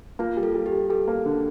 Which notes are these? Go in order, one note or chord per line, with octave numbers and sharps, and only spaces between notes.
A#3 F4
G3
A4
G3
G4
G3
G3 A4
A#3
D3